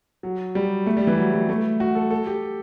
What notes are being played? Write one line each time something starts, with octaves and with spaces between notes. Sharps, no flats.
F#3
G3
A3
G3
E3
F#3
G3
A3
F#4
A4
A4
G4